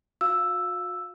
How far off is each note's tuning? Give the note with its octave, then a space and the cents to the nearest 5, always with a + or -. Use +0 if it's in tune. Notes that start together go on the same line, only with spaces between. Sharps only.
F#4 -45 F5 +0 E6 +0